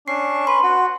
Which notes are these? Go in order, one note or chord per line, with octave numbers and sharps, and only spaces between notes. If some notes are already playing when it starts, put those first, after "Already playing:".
C#4 D4 C#6 C7
B4 C6
F#4 F#5